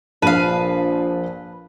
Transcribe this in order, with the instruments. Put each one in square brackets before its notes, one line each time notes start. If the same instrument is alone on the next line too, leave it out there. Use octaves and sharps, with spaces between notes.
[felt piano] A#1 A5 D#7 [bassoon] F3 [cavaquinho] B4 F5